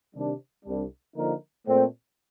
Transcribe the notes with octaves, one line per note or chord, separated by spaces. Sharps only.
C3 D#3 G3 D4
C2 C3 G3 D4
D3 F3 A#3 D#4 A#4
A#2 A3 C4